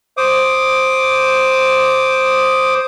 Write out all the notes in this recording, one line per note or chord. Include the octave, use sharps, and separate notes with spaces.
C5 D6 D#6